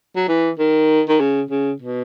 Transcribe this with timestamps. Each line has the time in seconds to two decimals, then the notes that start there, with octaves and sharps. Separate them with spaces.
0.16 F#3
0.28 E3
0.59 D#3
1.09 D#3
1.20 C#3
1.51 C#3
1.81 B2